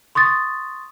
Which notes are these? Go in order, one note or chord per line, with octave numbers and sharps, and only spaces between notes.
C6 C#6 D#6 A6